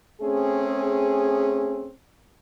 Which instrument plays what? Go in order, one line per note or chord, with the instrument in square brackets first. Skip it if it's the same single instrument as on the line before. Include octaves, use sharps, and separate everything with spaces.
[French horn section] A3 C4 C#4 G#4